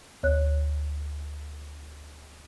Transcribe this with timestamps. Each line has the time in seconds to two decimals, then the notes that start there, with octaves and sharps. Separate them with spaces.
0.23 D2 C#5 F#6